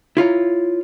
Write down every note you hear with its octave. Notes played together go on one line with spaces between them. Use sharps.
E4 F4 C#5 A#5